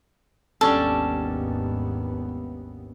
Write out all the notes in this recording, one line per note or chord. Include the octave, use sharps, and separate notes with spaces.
G#1 D#2 G3 B3 C#4 D4 A4